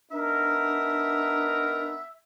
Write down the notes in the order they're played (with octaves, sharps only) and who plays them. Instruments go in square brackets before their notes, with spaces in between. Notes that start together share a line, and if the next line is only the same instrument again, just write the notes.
[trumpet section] B3 D#4 A#4 [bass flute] D4 [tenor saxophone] E5